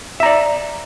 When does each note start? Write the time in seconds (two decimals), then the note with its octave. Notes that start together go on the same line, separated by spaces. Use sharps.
0.20 E5
0.23 A#5
0.26 D5